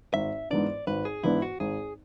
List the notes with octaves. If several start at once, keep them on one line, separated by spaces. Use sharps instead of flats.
G#1 E5
G#2 E3 B3 D4 D5
G#1 B4
G#4
G#2 E3 B3 D4 E4
F#4
G#1 G#4